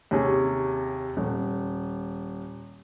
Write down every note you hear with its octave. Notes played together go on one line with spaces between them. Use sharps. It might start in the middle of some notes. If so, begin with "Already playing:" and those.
D#2 C3 C#4 G#4
D#1